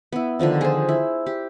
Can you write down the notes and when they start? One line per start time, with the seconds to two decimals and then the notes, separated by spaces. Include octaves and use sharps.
0.12 B3 E4
0.39 D3 D#3 F3 D4
0.61 G#4 C5
0.89 E4
1.26 G4